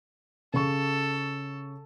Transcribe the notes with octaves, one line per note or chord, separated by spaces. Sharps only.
C#3 A4 C#6